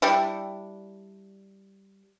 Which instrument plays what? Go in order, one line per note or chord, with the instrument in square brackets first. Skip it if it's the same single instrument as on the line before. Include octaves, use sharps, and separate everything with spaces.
[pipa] G3 D4 E4